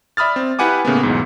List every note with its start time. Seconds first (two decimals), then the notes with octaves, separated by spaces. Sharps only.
0.17 D5 E5 B5 D#6 F6 A6
0.36 C4
0.59 E4 G4 B4 F#5 G#5 D6
0.85 A2 C#3 A#3 B3
1.03 B1 E2 G#2